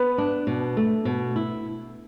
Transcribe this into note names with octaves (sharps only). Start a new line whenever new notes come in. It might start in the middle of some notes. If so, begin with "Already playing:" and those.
Already playing: B3 B4
D4
B2
A3
B2
E4